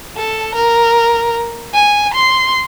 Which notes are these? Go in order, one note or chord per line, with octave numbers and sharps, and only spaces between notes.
A4
A#4
G#5
C6